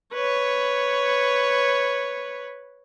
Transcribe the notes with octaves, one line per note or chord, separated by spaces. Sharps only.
B4 C#5